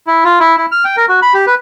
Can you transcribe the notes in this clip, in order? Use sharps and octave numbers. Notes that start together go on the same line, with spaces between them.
E4
F4
E4
E4
F6
G5
A#4
F#4
B5
G4
B4